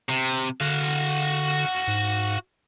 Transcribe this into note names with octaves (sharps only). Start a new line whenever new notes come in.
C3
D3 F#4 F5
G#2